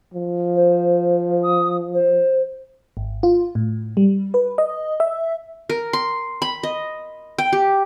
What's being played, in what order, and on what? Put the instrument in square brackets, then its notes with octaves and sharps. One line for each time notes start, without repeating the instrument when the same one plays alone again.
[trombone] F3
[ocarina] C5
D#6
C5
[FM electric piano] G#1
F4
A2
G3
B4
D#5
E5
[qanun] A#4
C6
B5
D#5
G5
G4